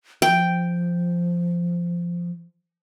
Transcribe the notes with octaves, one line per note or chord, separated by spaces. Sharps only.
F3 G5